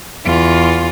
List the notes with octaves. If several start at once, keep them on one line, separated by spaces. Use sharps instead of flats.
E2 F4